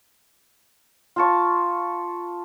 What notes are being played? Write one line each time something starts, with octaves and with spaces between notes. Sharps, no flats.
F4 A5 C#6